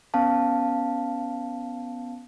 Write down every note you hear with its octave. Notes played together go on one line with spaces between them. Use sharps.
B3 C#4 F5 A5